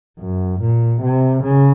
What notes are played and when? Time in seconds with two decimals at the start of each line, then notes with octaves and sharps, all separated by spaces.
0.20 F#2
0.61 A#2
1.02 C3
1.43 C#3